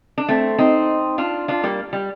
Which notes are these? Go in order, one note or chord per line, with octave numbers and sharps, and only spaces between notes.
D4
A3 C4
C4 D#4
D4 F4
D4 F4
G3 A#3
G3